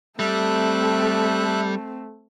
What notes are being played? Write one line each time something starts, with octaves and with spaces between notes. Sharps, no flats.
G3 A3 C4 A4 E5 F#6